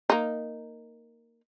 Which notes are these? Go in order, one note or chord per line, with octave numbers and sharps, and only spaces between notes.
A#3 D#4